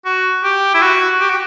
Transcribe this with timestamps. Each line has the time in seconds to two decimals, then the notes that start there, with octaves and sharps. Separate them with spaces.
0.05 F#4
0.44 G4
0.74 E4
0.82 F#4
1.20 G4
1.29 F#4